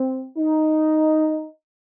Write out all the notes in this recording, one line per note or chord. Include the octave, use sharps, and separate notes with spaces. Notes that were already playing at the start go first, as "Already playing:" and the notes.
Already playing: C4
D#4